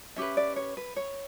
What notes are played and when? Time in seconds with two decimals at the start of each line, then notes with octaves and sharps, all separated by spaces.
0.16 C#4 G4 B4 E5
0.37 D5
0.56 C#5
0.77 B4
0.96 C#5